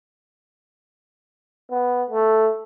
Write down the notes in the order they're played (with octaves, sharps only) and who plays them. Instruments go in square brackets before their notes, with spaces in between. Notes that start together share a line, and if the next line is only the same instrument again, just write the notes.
[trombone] B3
A3